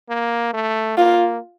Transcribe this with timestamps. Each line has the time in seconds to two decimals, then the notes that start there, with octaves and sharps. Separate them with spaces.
0.09 A#3
0.54 A3
0.98 A#3 F4